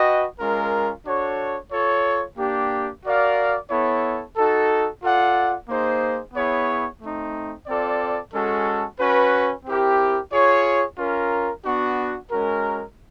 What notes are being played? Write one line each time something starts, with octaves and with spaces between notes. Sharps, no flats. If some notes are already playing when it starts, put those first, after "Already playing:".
Already playing: F#4 B4 D#5 G5
G#3 C#4 F4 A#4
D4 F#4 A4 C#5
F4 A4 C#5
A#3 D4 G4
F#4 A#4 D5 F5
B3 E4 A4 C#5
D#4 F#4 A4
F4 A4 D5 F#5
A#3 D#4 G#4 C5
B3 E4 G#4 C#5
A3 C4 D#4
C4 F4 A4 D5
G#3 C#4 F#4 A4
C#4 F#4 B4
C4 E4 G4 A#4
F4 G#4 C#5
C#4 F4 A#4
B3 D4 F#4
G#3 C#4 F#4 A#4